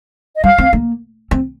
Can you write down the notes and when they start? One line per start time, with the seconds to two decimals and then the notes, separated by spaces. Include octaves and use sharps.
0.37 D#5
0.44 G3 F5
0.58 C4
0.73 A#3
1.31 C4